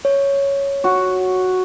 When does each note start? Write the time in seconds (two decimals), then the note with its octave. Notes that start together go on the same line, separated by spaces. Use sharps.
0.05 C#5
0.84 F#4